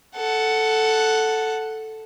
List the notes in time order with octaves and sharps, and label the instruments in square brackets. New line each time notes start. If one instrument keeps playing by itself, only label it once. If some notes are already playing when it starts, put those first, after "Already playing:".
[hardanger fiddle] A4 F#5